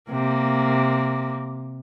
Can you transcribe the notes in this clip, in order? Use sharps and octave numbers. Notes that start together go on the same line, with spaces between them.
C3 A#3